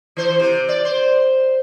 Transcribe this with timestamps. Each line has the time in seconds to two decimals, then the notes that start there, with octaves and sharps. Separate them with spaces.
0.17 E3 C5
0.40 C3
0.69 D5
0.85 C5